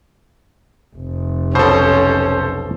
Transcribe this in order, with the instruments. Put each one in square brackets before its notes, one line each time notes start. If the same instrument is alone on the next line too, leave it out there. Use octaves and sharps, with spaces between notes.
[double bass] F1
[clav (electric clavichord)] B1 B2 [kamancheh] C#4 [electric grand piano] A4 C5